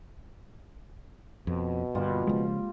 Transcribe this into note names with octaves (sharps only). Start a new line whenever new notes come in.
F2 B2
G2 D3 G3 A#3 F4
C#3 E3 F3 G#3